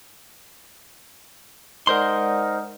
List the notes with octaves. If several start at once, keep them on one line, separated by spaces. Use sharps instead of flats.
G#3 D#4 A#4 C5 D5 F#5 C6